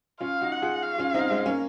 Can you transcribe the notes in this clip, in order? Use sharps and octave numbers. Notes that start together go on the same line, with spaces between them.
C#4 F4 F5
D#4 F#4
F#5
F4 G#4
F5
C#4 F4
C4 D#4
G#3 C4
A#3 C#4